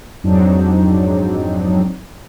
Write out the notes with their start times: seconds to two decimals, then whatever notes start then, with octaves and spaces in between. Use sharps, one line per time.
0.23 F2 G#2 F#3 C4 D4 D#4